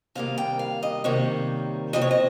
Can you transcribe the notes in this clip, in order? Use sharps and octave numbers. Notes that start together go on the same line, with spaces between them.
C3 D#3 G3 A#3 F5
G5
F5
D#5
C3 D#3 G3 A#3 C#5
C3 F3 C4 D#5
C#5
D#5